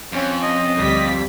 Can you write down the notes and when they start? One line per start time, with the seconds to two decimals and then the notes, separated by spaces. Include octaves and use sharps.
0.12 F2 C#4
0.43 D#5
0.77 D2 G3 B6